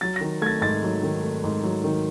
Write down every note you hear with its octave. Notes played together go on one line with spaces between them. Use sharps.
F#3 A6
A#6
D#3
A3 G#6 A6
G#2 A6
F#3
D#3
A3
G#2
F#3
D#3